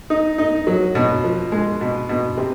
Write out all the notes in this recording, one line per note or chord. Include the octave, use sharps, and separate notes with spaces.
D#4
D#4
F#3
B2
F3
G#3
B2
B2
C3